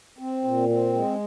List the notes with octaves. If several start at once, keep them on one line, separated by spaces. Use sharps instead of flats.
C4
A#2
C4
G#3